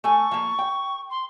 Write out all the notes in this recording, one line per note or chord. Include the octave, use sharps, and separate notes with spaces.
A3 A4 G#5 C#6
F3 A#3
G5
C6